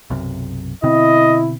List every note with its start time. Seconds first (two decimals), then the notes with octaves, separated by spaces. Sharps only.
0.10 B1 F#2 C3
0.83 B2 D3 C4 E4 D#5